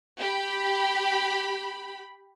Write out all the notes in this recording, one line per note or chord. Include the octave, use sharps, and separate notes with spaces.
G4 B5